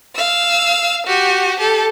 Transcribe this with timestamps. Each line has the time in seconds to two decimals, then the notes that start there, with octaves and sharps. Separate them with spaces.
0.15 F5 E6
1.06 F#4 G4
1.59 G4 A4